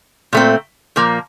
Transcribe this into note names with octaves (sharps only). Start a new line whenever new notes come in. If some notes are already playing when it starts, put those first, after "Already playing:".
A#2 A3 C4
A#2 F3 A#3